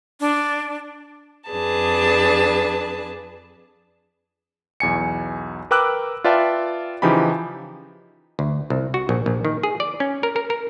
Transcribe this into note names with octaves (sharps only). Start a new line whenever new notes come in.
D4
F2 D4 G#4 B4 A5
B1 E2 G#5 C#7
A#4 B4 G5 D6 E6 F#6
F4 B4 D5 E5 G5 A5
C#3 E3 F3 D#4 G4 B5
D2
C2
F#4
A#1
A#1
D#3
G#4
D5
C#4
A#4
A#4
A#4